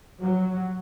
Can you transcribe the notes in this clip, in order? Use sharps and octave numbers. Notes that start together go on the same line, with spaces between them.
F#3